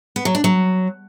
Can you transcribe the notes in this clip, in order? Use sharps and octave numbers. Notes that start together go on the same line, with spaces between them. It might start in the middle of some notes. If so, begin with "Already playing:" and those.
B3
F#3
D4
F#3